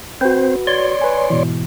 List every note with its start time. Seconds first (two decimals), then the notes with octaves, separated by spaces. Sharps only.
0.21 C4 F#4 B4 C5
0.67 C#5 D5 C6
1.01 B4 G#5
1.30 G#2 B2 E3